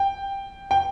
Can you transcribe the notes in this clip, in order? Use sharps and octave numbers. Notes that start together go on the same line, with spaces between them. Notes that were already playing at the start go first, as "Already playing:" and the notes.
Already playing: G5
G5